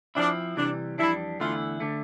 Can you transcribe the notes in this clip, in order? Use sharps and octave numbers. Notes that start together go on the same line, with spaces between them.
F3 C4 D4 E4
C3 E3 G3 D4
F2 E3 G3 D4 E4
E2 D3 A3 E4 F4
D3 A3